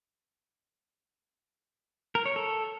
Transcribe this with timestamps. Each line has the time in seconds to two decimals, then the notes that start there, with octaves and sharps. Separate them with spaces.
2.15 A#4
2.26 C#5
2.36 A4